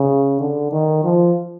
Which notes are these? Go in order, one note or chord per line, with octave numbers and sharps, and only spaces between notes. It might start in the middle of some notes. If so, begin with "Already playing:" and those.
Already playing: C#3
D3
D#3
F3